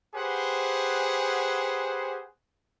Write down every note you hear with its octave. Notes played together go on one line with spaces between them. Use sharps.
G4 G#4 B4 C5 F#5